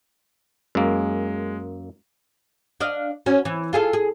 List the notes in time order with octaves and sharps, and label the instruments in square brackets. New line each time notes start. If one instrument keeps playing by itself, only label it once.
[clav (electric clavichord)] F#2 A#3 [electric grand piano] G#3
[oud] D4 D#5 F5
C#4 F#4
E3
F4 G#4 A4
G#4